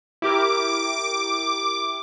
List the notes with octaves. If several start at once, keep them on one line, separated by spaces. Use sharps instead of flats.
E4 G4 A#4 D6